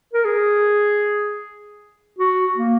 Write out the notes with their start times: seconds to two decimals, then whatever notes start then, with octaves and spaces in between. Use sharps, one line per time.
0.14 A#4
0.25 G#4
2.19 F#4
2.57 A#3